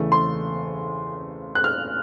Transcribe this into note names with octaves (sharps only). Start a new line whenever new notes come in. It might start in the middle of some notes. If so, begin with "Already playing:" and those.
Already playing: E2 C#3 E3 A3
C6
F#6
F6